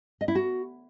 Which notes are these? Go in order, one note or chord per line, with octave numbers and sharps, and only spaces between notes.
D#5
E4
F#4